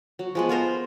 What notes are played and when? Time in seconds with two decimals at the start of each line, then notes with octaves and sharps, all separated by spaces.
0.19 F#3
0.35 F3 G#3 B3
0.49 B3 F4 A#4 C5